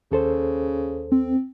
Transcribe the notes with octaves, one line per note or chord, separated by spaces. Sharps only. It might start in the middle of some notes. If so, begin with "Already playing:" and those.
D#2 C#3 A4 C5
C4